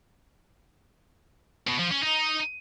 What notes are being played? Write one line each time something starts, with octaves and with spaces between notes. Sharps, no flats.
B2
F3
C#4
D#4